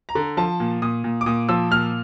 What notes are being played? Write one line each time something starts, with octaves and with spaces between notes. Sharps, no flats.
A#5
D3
F3 A5
A#2
A#2 D#6
A#2
D6
A#2 D#6
F3 E6
A#2 F6